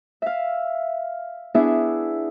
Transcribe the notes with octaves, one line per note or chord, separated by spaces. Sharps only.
E5 F5
B3 D4 E4 G#4 E5